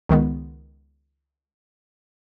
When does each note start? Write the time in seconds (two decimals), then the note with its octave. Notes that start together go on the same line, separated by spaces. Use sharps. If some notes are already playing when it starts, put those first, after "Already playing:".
0.09 C#2 D#3 G#3 B3